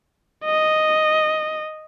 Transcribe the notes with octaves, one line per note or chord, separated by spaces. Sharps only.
D#5